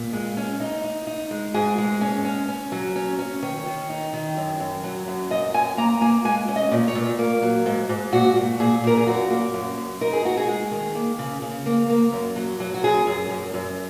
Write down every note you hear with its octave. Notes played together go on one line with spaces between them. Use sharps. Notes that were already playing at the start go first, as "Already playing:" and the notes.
Already playing: A#2
G#3
C#4
D#4
D#4
D#4
G#3
G#2 G#4
G#3
C#4
C#4
C#4
F#3
C#4
C#4
D#3 C#5
D#3
D#4
D#3
F#2
F#2
F#3
F#2
F#2 D#5
F#2 G#5
A#3 A#5
A#3 G#5
G#3 G#5
C#4
D#5
A#2
C#5
A#2
A#3
F#3
G#2
G#2
A#2 F#4
A#2
A#2 G#4
A#2 A#4
G#4
F#2 F#4
A#3
F#2
F#2
D#4 A#4
G#4
D#4 F#4
G#4
G#3
D#3
A#3
C#3
C#3
A#3
A#3
F#2
F#3
F#3
F#4
F#2 G#4
F#2
F#2
F#2